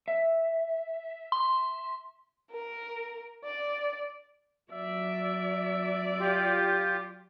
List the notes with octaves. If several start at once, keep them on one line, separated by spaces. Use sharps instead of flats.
E5
C6
A#4
D5
F#3 D5 E5
F4 G4